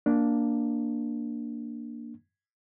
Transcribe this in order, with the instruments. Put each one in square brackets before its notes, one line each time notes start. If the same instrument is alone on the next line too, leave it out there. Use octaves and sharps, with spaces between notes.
[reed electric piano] A#3 D4